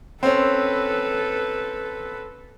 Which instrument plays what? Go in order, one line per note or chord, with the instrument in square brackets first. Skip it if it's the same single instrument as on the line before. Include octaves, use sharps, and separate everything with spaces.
[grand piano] C4 C#4 [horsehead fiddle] A4 B4